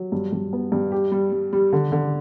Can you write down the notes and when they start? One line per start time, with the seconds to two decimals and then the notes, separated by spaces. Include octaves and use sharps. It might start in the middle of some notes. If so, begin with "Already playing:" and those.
Already playing: F#3
0.12 G2
0.32 G2
0.53 B3
0.72 G2
0.92 G4
1.12 G3
1.32 G3
1.53 G3
1.73 D3
1.92 D3